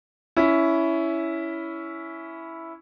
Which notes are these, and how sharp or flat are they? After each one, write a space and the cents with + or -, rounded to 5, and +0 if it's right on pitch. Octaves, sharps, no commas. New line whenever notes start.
C#4 +15 E4 +0